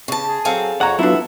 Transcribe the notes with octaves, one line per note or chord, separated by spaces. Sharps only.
C#3 G4 A5
G#4
F#3 C4 G#4 A4 F5
F2 C#5 F#5 A#5
F#3 B3 D4 E4 F4 A4 E5 F#5